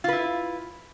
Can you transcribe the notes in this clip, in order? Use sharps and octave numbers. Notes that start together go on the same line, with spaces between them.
E4 F4 B4